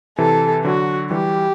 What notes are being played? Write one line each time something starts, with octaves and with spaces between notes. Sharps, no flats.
C3 E3 A4
D3 F#3 F#4
E3 G3 G4